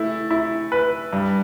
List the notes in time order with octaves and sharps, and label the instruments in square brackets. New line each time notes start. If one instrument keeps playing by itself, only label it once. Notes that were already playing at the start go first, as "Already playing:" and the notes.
Already playing: [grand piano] A3 E4
E4
B4
G2